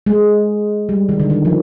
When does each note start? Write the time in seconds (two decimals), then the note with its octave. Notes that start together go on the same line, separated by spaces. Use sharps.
0.06 G#3
0.89 G3
1.09 D#3
1.20 D3
1.30 D#3
1.45 F3